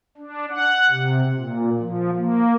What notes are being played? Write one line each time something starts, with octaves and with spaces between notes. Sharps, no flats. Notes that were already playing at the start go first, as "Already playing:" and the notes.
D4
F#5
C3
A#2
F3
A#3